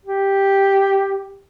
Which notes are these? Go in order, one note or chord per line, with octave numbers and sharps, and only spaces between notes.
G4